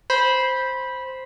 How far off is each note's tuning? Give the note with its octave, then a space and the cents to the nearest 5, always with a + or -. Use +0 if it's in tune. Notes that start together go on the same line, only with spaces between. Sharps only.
C5 +0 B5 -15